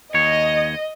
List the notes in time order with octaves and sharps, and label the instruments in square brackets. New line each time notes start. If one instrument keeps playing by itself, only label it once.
[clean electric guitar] D#2 C#5 [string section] D#5